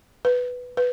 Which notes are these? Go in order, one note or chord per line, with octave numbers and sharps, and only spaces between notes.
B4
B4